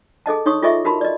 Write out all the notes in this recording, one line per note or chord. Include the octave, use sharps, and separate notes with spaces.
G#4 A4 D#5 A5
D#4 C#5 C6 C#6 D#6
F4 G#4 A4 D#5 E5 C#6
F#4 G4 A#4 A5 B5 C6
D5 D#5